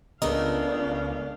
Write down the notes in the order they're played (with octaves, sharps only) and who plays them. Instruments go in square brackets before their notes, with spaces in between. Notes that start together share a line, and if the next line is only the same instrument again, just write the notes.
[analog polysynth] C#2 C#3 [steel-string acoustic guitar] A3 B3 A#4 [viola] D4 F5 [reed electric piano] D#5